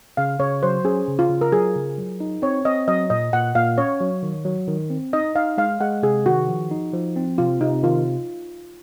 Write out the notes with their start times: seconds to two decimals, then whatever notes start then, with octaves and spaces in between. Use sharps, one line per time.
0.17 C#3 F5
0.39 C#3 C#5
0.63 F#3 C5
0.85 C#4 G#4
1.08 C#3
1.19 F4
1.30 C#3
1.41 A#4
1.52 F#3 G#4
1.76 C#3
1.98 F#3
2.20 D#4
2.42 C4 C#5
2.65 C4 D#5
2.87 F#3 D#5
3.10 A#2 D#5
3.33 A#2 F#5
3.55 A#2 F5
3.77 C#4 C#5
4.00 F#3
4.23 D#3
4.45 F#3
4.67 D#3
4.90 C4
5.13 D#4 D#5
5.35 D#4 F5
5.58 G#3 F5
5.81 G#3 F#5
6.03 C3 G#4
6.26 D#3 F#4
6.48 F3
6.71 D#4
6.93 F3
7.16 C4
7.38 C3 F4
7.61 C3 D#4
7.83 D#3 F4